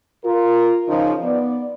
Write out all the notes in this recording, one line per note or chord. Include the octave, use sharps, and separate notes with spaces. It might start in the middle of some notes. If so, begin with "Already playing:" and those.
F4 A#4
C#3 F3 D#4
B3 D5